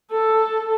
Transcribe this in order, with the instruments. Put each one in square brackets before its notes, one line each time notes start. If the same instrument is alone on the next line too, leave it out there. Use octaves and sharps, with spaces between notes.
[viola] A4